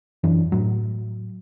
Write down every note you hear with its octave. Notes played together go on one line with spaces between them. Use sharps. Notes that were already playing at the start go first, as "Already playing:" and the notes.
F#2 E3 D4
A2 F#3